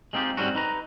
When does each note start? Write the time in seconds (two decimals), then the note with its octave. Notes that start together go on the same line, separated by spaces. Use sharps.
0.13 G#3 C4 D#4 F4 G4
0.37 G#2 G3 C4 C#4 F#4
0.55 D#4 B4 A#5